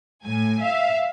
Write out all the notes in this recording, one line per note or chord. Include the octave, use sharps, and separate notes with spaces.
A2 G#5
E5 F5